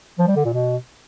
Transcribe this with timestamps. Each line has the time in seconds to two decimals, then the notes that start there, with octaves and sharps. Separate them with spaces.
0.19 F3
0.27 G3
0.36 D3
0.45 A#2
0.54 B2